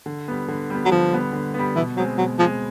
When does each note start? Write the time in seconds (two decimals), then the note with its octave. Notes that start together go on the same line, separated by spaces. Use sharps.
0.06 D3
0.28 G3 B3
0.48 D3
0.70 G3 B3
0.86 F#3
0.91 D3 F3
1.12 G3 B3
1.33 D3
1.54 G3 B3
1.76 B2 E3
1.97 F#3 G#3 C4
2.18 B2 F#3
2.39 F3 G#3 C4